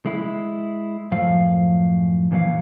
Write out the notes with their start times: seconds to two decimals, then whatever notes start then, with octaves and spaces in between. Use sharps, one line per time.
0.06 G#3 E4
1.11 F#2 A2 F3 F5
2.31 E2 A#2 E3 F#3 F5